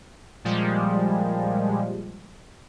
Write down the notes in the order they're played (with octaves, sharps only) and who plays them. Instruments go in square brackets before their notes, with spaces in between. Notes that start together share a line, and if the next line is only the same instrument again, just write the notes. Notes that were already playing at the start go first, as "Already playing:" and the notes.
[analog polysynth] A#2 F3 G3 G#3